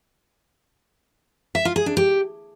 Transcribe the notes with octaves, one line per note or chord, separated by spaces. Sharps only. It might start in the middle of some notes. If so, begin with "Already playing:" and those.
E5
F4
G#4
D4
G4